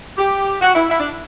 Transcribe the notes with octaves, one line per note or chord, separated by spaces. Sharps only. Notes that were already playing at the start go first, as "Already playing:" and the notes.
G4
F#4
E4
E4
D4